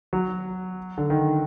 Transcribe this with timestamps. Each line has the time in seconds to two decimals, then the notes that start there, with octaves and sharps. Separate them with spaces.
0.13 F#3
0.98 D3
1.10 D#3